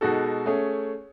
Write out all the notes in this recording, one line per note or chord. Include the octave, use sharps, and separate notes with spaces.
B2 G#3 D#4 F#4 A4
A3 C#4 G#4